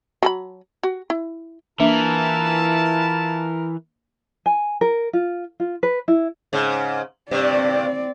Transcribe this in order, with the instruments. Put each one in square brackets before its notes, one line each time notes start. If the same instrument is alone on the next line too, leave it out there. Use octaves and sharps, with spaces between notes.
[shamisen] F#3 A4 B5
F#4
E4
[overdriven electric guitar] E3 [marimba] A#3 D4 E5 [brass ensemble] E4 F4 A5 [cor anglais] A#4
[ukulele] G#5
A#4
F4
F4
B4
E4
[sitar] G#2 C#3
[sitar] G2 C3 [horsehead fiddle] C4 D5